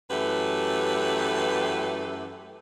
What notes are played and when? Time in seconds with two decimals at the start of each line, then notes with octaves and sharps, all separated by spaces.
0.11 F#2 E3 A3 G4 B4